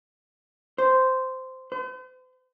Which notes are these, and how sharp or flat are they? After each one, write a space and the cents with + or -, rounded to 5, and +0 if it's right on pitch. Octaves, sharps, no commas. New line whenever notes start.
C5 -10
C5 -45